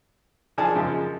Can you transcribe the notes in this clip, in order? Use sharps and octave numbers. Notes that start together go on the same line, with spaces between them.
D#3 F3 D4 G#4 G#5 A5
F#2 C#3 F3 G#3